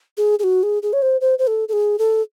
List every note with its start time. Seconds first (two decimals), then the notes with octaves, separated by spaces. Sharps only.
0.17 G#4
0.39 G#4
0.44 F#4
0.63 G#4
0.83 G#4
0.93 C#5
1.02 C5
1.21 C5
1.39 C5
1.47 A4
1.69 A4
1.73 G#4
1.99 A4